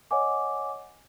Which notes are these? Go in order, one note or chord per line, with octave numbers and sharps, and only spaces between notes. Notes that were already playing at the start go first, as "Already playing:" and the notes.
C#5 D#5 F#5 G#5 D6